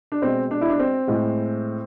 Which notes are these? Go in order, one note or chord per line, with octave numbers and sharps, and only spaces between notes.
D4
B2 G#3 C4
D4
E4
D4
C4
A2 G#3